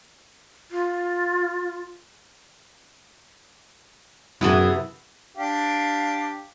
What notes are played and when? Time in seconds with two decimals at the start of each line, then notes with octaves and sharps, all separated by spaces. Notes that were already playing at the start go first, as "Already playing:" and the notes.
0.71 F4
4.41 F#2 C3 E3 B3 E4 G#4 A4 B4
5.37 D4 G4 F5